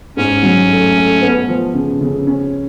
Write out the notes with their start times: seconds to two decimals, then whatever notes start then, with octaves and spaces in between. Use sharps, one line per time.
0.16 G#2 C#4
0.43 F#3
0.69 A3
0.96 A3
1.21 B3
1.48 F3
1.74 C#3
2.01 C#3
2.27 C#4